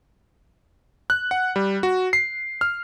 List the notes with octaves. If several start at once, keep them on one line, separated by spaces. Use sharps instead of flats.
F#6
F#5
G3
F#4
C7
F6